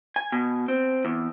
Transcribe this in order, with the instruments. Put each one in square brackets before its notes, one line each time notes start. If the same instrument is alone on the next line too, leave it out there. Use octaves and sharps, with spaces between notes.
[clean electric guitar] G#5
B2
C4
E2